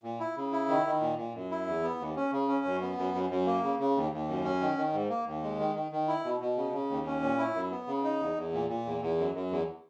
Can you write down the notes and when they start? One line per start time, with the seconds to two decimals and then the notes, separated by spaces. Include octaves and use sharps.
0.03 A#2
0.20 E4
0.36 C#3
0.52 E4
0.69 D#3
0.86 D#3
1.01 A#2
1.17 A#2
1.34 F#2
1.51 E4
1.67 E2
1.83 B3
2.00 D#2
2.16 C#4
2.32 C#3
2.48 C#4
2.65 F#2
2.81 B3
2.98 F#2
3.14 F#2
3.30 F#2
3.46 A#3
3.63 C#3
3.79 C#3
3.96 D#2
4.12 D#2
4.28 F#2
4.44 C#4
4.61 D#3
4.77 D#3
4.93 G#2
5.09 A#3
5.26 D#2
5.42 G#3
5.59 D#3
5.75 D#3
5.92 D#3
6.08 E4
6.24 B2
6.40 B2
6.57 C#3
6.73 C#3
6.90 D#2
7.06 C#4
7.22 A#2
7.38 E4
7.55 F#2
7.72 B3
7.87 C#3
8.04 D#4
8.20 E2
8.36 E2
8.53 A#2
8.69 A#2
8.85 E2
9.01 E2
9.18 F#2
9.34 F#2
9.51 E2